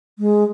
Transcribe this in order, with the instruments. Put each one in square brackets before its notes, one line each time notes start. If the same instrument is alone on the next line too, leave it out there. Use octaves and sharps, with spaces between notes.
[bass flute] G#3